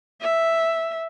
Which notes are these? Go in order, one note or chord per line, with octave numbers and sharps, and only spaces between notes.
E5